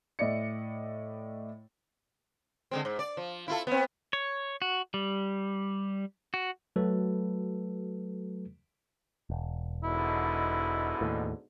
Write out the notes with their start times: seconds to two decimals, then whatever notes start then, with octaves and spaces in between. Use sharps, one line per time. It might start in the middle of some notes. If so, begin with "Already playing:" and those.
0.19 A2 E4 D5 D#5 C#7
2.71 D3 G#3 C4
2.85 G#2
2.99 D5
3.17 F3
3.48 E4 F4 A4
3.67 B3 C4
4.13 C#5
4.62 F#4
4.94 G3
6.34 F#4
6.76 F#3 A3 F#4 A4 B4
9.30 E1
9.84 G#2 B2 D3 E4
11.01 D#2 A2